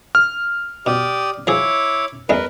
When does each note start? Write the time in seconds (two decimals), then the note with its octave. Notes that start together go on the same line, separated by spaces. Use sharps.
0.15 F6
0.87 B2 G4 D5 D#6
1.47 F3 E4 G#4 C#5 D6
2.30 E2 G#3 A#4 B4